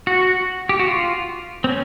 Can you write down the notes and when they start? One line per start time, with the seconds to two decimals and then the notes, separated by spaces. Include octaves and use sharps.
0.07 F#4
0.69 G4
0.80 F#4
0.88 F4
1.64 C4
1.69 C#4